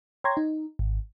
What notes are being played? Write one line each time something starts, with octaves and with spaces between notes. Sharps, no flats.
C#5 G5 A#5 C6 G#6 A#6
D#4
G#1